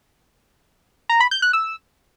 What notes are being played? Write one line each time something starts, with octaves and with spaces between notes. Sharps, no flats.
A#5
B5
G6
F#6
E6